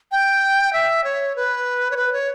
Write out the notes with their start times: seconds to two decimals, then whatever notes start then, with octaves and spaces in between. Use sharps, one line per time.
0.12 G5
0.73 E5
1.04 C#5
1.36 B4
1.91 C#5
1.97 B4
2.13 C#5